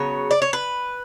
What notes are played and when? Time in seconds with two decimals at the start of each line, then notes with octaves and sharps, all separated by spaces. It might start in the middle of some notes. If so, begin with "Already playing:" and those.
Already playing: C#3 F#3 B3 C#5
0.31 D5
0.42 C#5
0.53 B4